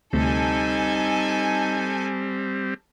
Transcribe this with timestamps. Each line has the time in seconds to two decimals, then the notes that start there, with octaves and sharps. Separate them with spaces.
0.13 D2 C3 G3 A3 C4 D#4 A4 G#5